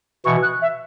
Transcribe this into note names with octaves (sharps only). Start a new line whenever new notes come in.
B2 E3 C#6
F#6
E5